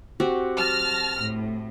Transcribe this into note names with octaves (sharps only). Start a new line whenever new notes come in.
C4 F#4 G4
A5 F6 A#6
A2